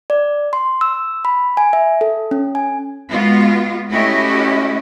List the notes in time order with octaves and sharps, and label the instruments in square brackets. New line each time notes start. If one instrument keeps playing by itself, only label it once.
[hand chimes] D5
C6
E6
B5
G#5
E5
A4
C#4
G#5
[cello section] G#3 B3 F4 F#4
A3 C#4 E4 F#4 G4 D#5